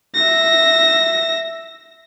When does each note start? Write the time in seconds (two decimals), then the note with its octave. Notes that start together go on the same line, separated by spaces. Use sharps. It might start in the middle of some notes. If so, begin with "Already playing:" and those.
0.15 E5 A#6